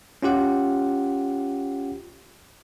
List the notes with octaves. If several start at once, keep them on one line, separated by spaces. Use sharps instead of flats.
C#4 F4 G4 F#5